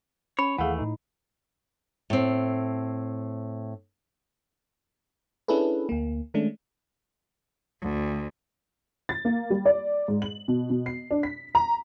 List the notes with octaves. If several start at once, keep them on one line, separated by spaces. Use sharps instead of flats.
C#4 C#5 B5
D#2 E3 A3 G#4 F5 F#5
A2 D#4
A2 C4
C#4 D4 E4 G#4 A4 B4
D2 A#3
D#3 G#3 A3 C#4 D4
D2
A6
A#3
G3
D5
G#2
F#7
B2
B2
C7
D4
B6
A#5